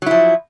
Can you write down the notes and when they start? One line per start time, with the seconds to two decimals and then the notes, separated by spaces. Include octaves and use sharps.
0.02 F#3
0.06 E4
0.11 F3